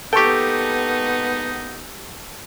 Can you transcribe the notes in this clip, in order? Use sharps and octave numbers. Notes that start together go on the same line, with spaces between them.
G#2 A#3 B3 D#4 G4 A4 G5 C#6